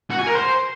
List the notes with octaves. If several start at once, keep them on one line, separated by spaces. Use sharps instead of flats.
F#4
G#5
A#4
C5